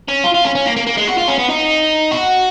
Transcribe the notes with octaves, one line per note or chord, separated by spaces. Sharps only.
C#4
F4
F4
C#4
C#4
A#3
A#3
A#3
G#3
F#4
F4
C#4
B3
D#4
F#4